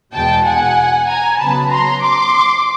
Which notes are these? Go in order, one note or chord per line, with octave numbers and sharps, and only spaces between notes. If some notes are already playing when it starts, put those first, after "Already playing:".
E2 B2 G#3 G5 A5
F#5 G#5
G#5 A#5
C#3 F#3 B3 A5 B5
A#5 C6
C6 D6